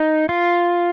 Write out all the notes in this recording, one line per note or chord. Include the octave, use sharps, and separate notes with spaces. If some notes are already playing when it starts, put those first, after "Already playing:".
Already playing: D#4
F4